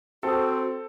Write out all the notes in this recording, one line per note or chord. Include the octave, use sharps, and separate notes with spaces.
C4 F#4 A4 C5 D#6